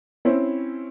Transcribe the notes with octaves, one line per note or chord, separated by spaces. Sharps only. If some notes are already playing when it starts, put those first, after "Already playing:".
C4 C#4 E4 C5